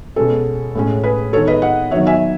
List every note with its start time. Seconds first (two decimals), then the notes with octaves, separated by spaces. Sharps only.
0.16 B2 G#3 C#4 A4
0.75 A2 G#3 C#4
1.03 G#4 B4
1.33 D#3 G#3 B3 A4 C#5
1.47 B4 D#5
1.62 D#5 F#5
1.91 D#3 F#3 B3 C#5 E5
2.07 E5 G#5